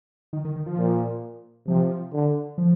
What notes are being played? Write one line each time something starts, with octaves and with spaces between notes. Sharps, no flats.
D#3
D#3
D#3
F3
A#2
C3 F3
D3
F3